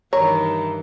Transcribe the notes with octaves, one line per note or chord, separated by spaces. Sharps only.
G2 D#3 E3 C#5 A#5